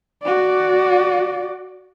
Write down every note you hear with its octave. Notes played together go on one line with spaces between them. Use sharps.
F#4 D5